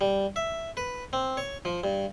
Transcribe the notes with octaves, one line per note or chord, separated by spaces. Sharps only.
G3
E5
B4
C4
C#5
F3
G2